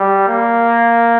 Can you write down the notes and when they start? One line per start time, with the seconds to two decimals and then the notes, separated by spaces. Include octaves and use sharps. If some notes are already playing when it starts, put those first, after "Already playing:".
Already playing: G3
0.28 A#3